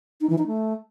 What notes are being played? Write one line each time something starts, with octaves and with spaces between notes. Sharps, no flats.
D#4
E3
D#4
A3